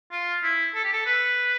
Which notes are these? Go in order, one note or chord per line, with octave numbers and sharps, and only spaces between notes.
F4
E4
A4
G4
A4
B4